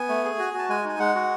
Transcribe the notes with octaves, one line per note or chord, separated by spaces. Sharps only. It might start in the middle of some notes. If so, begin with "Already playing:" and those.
Already playing: B3 G#5
A3
G#4
F#4
F#4
A5
G#3 G#5
D#4 G#5
G#3 F#5
F#4